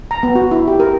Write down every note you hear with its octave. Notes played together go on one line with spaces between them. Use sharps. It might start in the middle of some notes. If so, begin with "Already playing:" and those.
A#5
B3
F#4
E4
G4
A#4